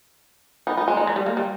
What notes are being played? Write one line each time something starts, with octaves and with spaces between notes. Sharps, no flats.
B3 D#4
B3 D#4
G#3
D#4
E3
G3
A#3
G3